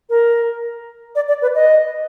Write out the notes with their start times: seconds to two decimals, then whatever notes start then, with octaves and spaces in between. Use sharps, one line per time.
0.10 A#4
1.15 D5
1.28 D5
1.42 B4
1.55 D#5